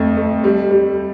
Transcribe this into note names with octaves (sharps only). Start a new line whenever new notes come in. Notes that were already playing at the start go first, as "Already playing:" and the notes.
Already playing: F2 A3
A3
G3
G3